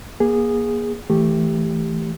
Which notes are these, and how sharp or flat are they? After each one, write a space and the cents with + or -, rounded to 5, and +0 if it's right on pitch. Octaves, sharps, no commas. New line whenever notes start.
A#3 +30 G#4 -10
E3 -15 A3 +0 G4 +0